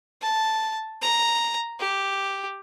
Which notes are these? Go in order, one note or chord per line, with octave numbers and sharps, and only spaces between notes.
A5
A#5
G4